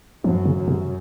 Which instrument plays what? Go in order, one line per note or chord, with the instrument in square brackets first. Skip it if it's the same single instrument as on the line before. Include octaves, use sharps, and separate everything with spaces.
[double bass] F#2 [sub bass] F3
[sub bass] C#3
[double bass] F#2
[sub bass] C3